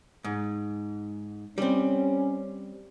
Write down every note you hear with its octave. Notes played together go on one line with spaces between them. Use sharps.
G#2
G3 C4 C#4